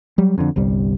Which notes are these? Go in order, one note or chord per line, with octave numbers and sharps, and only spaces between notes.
F#3 G3
F2 D3
G1 C2 G3